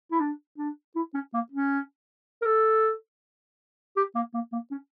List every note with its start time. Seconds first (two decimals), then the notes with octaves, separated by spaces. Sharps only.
0.12 E4
0.20 D4
0.58 D4
0.96 E4
1.14 C#4
1.34 A#3
1.52 C#4
2.42 A#4
2.46 A4
3.97 G4
4.15 A#3
4.34 A#3
4.53 A#3
4.71 C#4